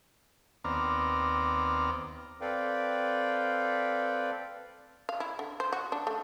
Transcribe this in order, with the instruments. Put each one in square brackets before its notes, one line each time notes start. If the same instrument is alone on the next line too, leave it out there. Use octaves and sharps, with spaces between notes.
[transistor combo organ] D#2 B3 C4 D5 A#5 F6
[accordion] C4 A4 B4 D5 F5 G5
[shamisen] F5
E4
D3
C5
F#4
D4
A3